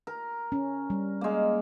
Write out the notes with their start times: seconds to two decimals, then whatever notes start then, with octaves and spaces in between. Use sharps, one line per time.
0.07 A#4
0.52 C#4
0.90 G3
1.21 G#3 A#3